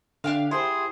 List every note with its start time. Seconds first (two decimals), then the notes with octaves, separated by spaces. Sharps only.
0.24 D3 D4 G4 F5
0.51 E4 G4 G#4 C5 G5